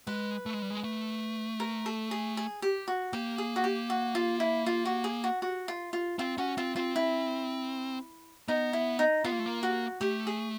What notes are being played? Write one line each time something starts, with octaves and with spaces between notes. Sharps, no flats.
G#3 B4
A3
G#3
G3
G#3
A3
A#4
A4
G#4
G#4
G4
F#4
A#3 G4
G#4
F#4
G4
F#4
F4
E4
F4
F#4
G#4
F#4
F#4
F4
F4
C4 F4
C#4 F#4
C4 F4
C4 F4
E4
B3 D#4
E4
D#4
B3 F4
A#3
A3
A#3
F#4
A3 G4
G#4